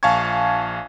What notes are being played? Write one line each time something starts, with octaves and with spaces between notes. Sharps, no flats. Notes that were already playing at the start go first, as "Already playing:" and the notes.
A#1 F5 G#5 A5 C#6 G#6